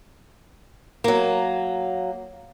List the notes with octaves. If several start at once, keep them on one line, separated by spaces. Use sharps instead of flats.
F#3 A#3